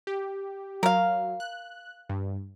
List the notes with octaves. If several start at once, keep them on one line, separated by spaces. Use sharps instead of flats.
G4
F#3 A#4 F5
F#6
G2